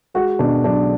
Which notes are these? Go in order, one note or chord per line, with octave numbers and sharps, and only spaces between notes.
G#3 F#4
B2 D4
B1 D4